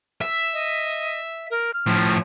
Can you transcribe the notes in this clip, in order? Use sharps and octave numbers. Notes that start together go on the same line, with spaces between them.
E5
D#5
A#4
F6
A2 F3